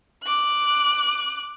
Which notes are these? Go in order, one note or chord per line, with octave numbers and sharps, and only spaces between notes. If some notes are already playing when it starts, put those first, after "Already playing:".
D6 F#6